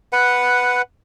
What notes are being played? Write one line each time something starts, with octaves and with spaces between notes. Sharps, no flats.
B4 F#5